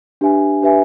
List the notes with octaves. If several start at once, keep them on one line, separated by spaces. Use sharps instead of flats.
D4 G4 B4 E5 G#5
D4 G4 B4 E5 G#5